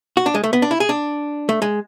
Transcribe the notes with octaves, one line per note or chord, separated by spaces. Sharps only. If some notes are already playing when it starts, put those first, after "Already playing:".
F#4
D4
G#3
A3
B3
D4
E4
G#4
D4
A3
G#3